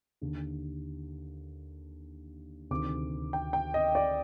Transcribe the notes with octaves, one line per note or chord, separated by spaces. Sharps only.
D#2 D3
D2 C3 D#3 D6
G5
G5
D#5
D5